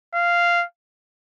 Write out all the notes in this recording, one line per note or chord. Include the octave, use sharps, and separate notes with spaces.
F5